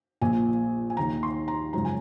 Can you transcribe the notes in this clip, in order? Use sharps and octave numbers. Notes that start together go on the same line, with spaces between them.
A#1 A#2 F3 G#5
G#5
D#2 D#3 A#5
C6
A#5
G#1 F#2 C#3 F3 A#5
G#5